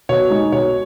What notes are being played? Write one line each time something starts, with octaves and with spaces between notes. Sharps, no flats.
B2 C#5
G#3 D#4
B2 C#5